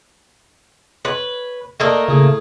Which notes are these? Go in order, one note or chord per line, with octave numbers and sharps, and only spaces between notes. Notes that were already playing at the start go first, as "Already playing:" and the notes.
B4 C#5
A3 A#3 D4 A#4 D#5 G5
A2 C#3 G#4